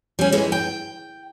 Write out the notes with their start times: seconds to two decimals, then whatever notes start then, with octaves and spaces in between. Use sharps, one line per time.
0.19 G3 C#4
0.32 E3 G#3 E4
0.52 G5